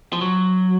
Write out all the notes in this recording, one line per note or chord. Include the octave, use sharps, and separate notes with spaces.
F3
F#3